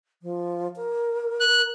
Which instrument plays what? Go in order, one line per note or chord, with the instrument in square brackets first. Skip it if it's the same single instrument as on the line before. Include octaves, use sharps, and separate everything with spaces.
[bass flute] F3
A#4
[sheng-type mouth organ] F#6